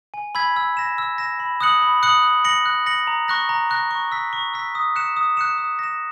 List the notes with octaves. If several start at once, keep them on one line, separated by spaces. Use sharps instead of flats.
G#5
B5 E6 G#6 B6
E6
A#6 E7
E6
A#6 E7
B5
D#6 F#6 C#7 F#7
B5
D#6 F#6 C#7 F#7
F#6
A#6 C#7 F#7
F#6
A#6 C#7 F#7
A#5
C#6 F#6 A#6
A#5
C#6 F#6 A#6
C#6
E6 B6
C#6
E6 B6
D#6
F#6 C#7 E7
D#6
F#6 C#7 E7
D#6
A#6 E7